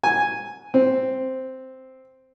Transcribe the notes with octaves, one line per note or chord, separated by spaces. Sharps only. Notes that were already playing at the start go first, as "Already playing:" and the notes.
G#5
C4